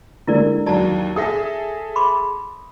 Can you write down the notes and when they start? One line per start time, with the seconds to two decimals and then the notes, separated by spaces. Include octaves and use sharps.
0.27 D3 G#3 E4 A#4 D5
0.66 D#2 F#3 D5 A5 A#5
1.16 G#4 A4 E5 D#6 A#6
1.96 B5 C6 D6